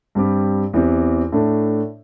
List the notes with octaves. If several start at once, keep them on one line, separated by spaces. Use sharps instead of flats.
G2 G3 C4 G4
E2 E3 C4 G4
A2 A3 D4